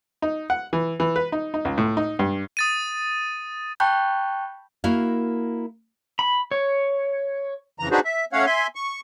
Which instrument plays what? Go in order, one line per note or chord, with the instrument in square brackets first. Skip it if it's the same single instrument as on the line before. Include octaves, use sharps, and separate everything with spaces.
[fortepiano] D#4
F#5
E3
E3
B4
D#4
D#4
C#2
A2
D#4
G2
[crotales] D#6 A6 D#7
[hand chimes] G5 A5 B5 C#6 F#6 G6
[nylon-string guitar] A#3 E4 F#4 A#4 F5
[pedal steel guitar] B5
C#5
[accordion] F2 C#3 E3 A#5
D4 D#4 F#4 G#4 B4 C5
E5
A3 C#4 C#5 F5 F#5
E5 G#5 C6
C#6